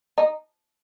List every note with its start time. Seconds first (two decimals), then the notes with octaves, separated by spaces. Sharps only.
0.18 D#4